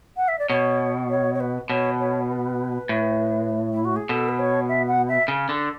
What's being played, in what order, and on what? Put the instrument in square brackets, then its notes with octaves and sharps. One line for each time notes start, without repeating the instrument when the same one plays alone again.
[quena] F#5
E5
D5
[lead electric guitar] B2 [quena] C#5
[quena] C#5
C#5
B4
[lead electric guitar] B2 [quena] C#5
[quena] C#5
B4
[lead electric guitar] A2
[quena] E4
F#4
G#4
[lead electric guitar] B2 [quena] A4
[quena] B4
C#5
E5
F#5
E5
[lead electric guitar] C#3
D3